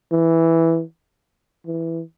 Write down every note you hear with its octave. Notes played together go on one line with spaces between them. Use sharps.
E3
E3